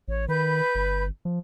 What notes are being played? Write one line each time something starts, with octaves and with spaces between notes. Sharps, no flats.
A1 C#5
D#3 B4 B5 G6
G1
F3